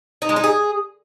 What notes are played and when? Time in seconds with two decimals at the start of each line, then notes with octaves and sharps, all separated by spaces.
0.22 D#4
0.29 G#3
0.36 D#4
0.44 G#4